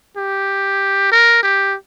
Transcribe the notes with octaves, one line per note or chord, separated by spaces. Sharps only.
G4
A#4
G4